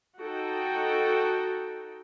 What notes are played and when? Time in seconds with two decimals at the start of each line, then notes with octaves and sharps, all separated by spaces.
0.20 D#4 F#4 A4 G5